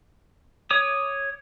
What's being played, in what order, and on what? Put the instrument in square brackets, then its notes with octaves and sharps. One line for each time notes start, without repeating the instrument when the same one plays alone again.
[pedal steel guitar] C#5 D6 D#6